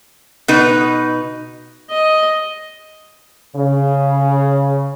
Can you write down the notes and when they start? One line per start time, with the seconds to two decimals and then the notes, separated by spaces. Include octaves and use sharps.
0.48 B2 D#4 B4
1.90 D#5
3.55 C#3